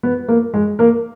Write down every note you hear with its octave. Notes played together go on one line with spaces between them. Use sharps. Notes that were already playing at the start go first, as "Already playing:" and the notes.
B3 B4
A#3 A#4
G#3 G#4
A#3 A#4